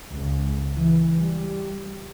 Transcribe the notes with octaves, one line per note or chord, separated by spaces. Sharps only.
C#2
E3
G3